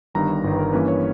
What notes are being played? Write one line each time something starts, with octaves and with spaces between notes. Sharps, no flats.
G1 G2 D#3 A#5
G1 G2 D#3 B4
A#4
G2 E3 A#3 C#4 B4
C#5